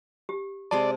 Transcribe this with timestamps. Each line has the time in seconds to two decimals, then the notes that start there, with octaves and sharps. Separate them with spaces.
0.29 G4
0.71 C3 G#3 D5 A5 C6